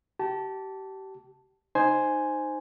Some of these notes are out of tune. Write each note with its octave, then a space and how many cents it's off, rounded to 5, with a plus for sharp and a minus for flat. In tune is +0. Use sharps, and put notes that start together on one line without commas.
G4 -30 A5 +0
D#4 -10 C5 +0 G#5 +0